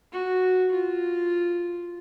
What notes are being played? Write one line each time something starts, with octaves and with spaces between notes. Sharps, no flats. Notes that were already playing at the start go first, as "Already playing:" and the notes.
F#4
F4